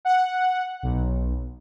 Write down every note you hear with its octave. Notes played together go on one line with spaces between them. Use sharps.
F#5
B1